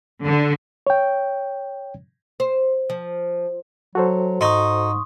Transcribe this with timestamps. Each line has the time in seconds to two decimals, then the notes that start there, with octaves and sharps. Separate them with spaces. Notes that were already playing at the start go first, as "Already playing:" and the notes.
0.25 D3
0.87 C#5 G5
2.40 C5
2.90 F3
3.95 F#3 F#4 A4 C5
4.41 G#2 D#4 C6 C#6 D#6